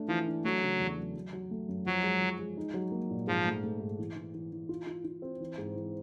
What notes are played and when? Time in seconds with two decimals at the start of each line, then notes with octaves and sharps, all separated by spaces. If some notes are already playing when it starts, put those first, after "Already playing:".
Already playing: A3 D4
0.08 E3 F3
0.27 D4
0.44 F#3 A3
0.62 C#3
0.80 E2
0.98 F#3
1.15 F#3
1.33 F#3
1.51 A3
1.69 F#2
1.86 F3 F#3
2.03 G#3
2.21 F3
2.39 G#3
2.57 D#4
2.74 F#3
2.92 A#3
3.10 A#2
3.27 G#2 F3
3.45 A3
3.63 A3
3.80 G#2
3.99 E3
4.16 E3
4.34 E3
4.52 E3
4.69 F4
4.87 F4
5.04 F4
5.22 C4
5.40 E3
5.58 G#2
5.76 E3